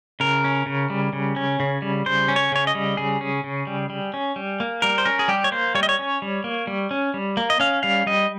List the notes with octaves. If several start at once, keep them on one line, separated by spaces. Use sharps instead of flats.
C#3 A#4
C#4
C#3
G3
C#3
C#4
C#3
G3
C#3 C5
C#4
C#5
C#3 C#5
D#5
G3
C#3 G#4
C#4
C#3
G3
G3
C#4
G3
A#3
G3 A#4
C5
C#4 A#4
G#4
G3 G4
C#5
A#3 C5
G3 C#5
D#5
C#5
C#4
G3
A#3
G3
C#4
G3
A#3
D#5
C#4 F5
G3 F5
G3 D#5